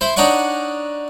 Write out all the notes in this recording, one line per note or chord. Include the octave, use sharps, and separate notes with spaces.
E4 C5
D4 D#4 C#5 D5 F#5 C#6